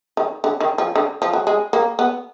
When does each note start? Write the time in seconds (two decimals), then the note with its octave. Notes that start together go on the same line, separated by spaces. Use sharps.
0.17 D#3
0.44 D3
0.60 D#3
0.78 F3
0.95 D3
1.22 F3
1.33 F#3
1.47 G#3
1.73 A#3
1.99 B3